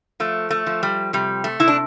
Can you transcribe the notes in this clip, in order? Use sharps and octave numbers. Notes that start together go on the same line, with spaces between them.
F3 A3
A3
F3
G3
C3 G3
A3
C3 E4
D4